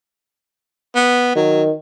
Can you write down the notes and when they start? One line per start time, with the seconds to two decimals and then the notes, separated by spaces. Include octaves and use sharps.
0.95 B3
1.36 D#3 F#3